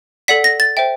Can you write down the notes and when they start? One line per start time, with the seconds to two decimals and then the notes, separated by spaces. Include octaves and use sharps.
0.28 A4 D5 F#5 B6
0.44 A#6
0.60 A6
0.77 C5 E5 G5